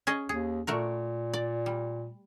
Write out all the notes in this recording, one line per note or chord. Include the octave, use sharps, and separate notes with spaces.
C#4 G#4 D#5
D#2 G#4
A#2 A3 F#4 A#4
D5
G3